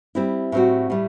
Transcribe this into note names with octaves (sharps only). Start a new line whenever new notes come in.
G3 C4 E4
A2 G3 C4 F#4
A2 G3